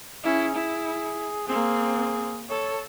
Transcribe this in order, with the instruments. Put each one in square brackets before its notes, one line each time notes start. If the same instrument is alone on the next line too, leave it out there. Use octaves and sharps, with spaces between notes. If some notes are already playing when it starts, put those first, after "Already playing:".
[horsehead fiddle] C#4 E4 [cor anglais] G#4
[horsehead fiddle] E4
[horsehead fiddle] A#3 C4 [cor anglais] G#4
[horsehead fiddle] A4 [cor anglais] C#5